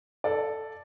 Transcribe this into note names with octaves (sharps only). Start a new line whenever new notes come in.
A4 D5